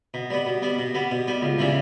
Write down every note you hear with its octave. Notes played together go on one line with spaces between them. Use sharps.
B2
G3 B3
B2
G3 B3
B2
G3 B3
B2
G3 B3
C#2
C#3 E3 G3